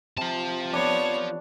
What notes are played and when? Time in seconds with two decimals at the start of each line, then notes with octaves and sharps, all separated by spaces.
0.18 C3 F3 A5
0.73 B3 D4 C#5